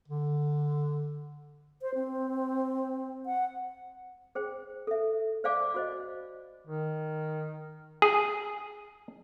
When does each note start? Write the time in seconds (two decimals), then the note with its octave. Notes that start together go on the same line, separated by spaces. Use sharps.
0.08 D3
1.82 C5
1.95 C4
3.26 F#5
4.35 G#4 C5 G5
4.87 A4 E5
5.44 C5 D5 F5 G#5 D6
5.74 F#4 C5 D#5
6.67 D#3
8.02 G#4